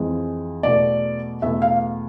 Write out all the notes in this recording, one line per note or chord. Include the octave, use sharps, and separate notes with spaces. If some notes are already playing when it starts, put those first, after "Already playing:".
Already playing: F2 E3 G#3
E2 B2 A3 D5
E2 B2 A3 E5
F5